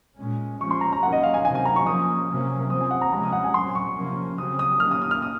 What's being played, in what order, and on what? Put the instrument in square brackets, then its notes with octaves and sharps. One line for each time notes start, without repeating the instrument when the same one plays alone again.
[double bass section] A#2 G#3 C#4
[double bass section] F3 G#3 C#4 [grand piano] C#6
[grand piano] C6
A#5
A#5
[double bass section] D#3 F#3 A#3 C#4 [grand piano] F#5
[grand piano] D#5
F5
G#5
[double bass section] C3 D#3 F#3 C4 [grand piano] G#5
[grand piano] G#5
A#5
C#6
[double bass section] F3 A#3 C#4 [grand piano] D#6
[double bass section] C3 F#3 A#3 C#4
[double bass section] F3 C4 [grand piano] D#6
[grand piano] G#5
F#5
A#5
[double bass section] C3 F3 G#3 C#4 [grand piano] A#5
[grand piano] D#6
F#5
G#5
[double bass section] A#2 F#3 C4 [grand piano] C6
[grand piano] C#6
[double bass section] C3 F3 A#3 C#4
[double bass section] C#3 F#3 C4 [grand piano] D#6
[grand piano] D#6
[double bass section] D#3 A#3 C#4 [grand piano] F6
[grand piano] D#6
D#6
F6
D#6